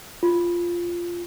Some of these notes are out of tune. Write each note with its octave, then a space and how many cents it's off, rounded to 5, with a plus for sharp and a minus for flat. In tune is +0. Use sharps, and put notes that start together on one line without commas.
F4 -5